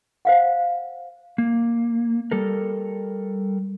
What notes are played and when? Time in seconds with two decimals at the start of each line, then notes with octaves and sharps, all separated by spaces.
0.25 C5 F5 F#5
1.38 A#3
2.31 G3 A4 A#4